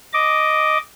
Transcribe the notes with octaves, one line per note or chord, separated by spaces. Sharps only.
D#5 D6